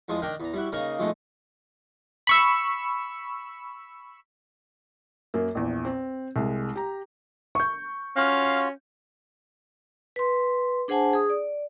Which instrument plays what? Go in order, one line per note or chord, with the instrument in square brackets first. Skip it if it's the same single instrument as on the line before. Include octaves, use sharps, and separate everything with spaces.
[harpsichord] E2 F3 G#3 D#6
D#3 D4 A#4 G5 A#5
E2 A#5
G3 E4 F#4
C#3 A#3 D#4 A#4 A#5 C#6
F2 B2 G#3 A3 D#4
[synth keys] B5 C#6 E6
[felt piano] F#2 A#3
A#1 E2
C4
C2 G#3
G4 A#5
C#6 G6
[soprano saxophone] C#4 [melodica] F4 F#4 [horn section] F5
[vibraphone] B4 C6
D4 G#4 C5 F#5 G#5 A5
G#4 D#6
D5